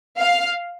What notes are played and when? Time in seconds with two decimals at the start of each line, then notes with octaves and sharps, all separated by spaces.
0.20 F5